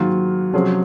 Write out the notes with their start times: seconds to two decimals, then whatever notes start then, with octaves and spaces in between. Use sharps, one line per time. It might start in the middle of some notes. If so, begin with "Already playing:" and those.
Already playing: G#2 D#3 F#3 A#3 F4
0.53 C3 F3 F#3 G#3 C#4 G#4